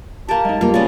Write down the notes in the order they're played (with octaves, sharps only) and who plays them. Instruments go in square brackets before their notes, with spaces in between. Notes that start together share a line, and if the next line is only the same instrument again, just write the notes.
[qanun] A#3 G4 [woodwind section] A5
[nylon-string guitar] G#3 D#4
[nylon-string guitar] G3 A#3 [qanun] F4
[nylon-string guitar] A#2 G#5 [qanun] C#3 B3 [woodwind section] D5